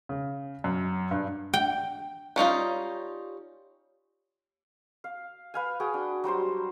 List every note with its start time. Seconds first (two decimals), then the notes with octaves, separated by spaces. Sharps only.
0.09 C#3
0.64 F#2
1.11 G2
1.54 G5
2.36 G3 C#4 D#4 F4
5.04 F5
5.54 B4 F5 G#5
5.80 F#4 G#4 G5
5.94 D4
6.24 F#3 G3 C5 C6